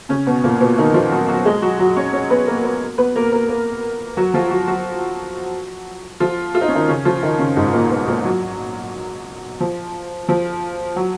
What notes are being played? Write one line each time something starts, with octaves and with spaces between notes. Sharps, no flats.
C#3 C#4
B2 B3
A#2 A#3
B2 B3
D#3 D#4
F3 F4
F#3 F#4
F#3 F#4
G#3 G#4
F#3 F#4
F#3 F#4
C#4 C#5
C#4 C#5
B3 B4
A#3 A#4
B3 B4
B3 B4
A#3 A#4
A#3 A#4
A#3 A#4
F#3 F#4
F3 F4
F#3 F#4
F#3 F#4
F3 F4
F4
D#4
C#4
D#3 D#4
C#3 C#4
F3 F4
D#3 D#4
C#3 C#4
G#2 G#3
A#2 A#3
B2 B3
A#2 A#3
F#3
F3
F3
F#3